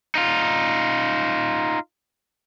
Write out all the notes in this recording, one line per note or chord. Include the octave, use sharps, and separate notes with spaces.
D#4 F4